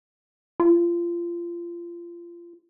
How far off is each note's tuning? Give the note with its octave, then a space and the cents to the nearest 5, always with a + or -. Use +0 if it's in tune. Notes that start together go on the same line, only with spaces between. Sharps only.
F4 -25